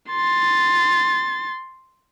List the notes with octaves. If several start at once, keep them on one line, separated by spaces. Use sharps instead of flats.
C6 A6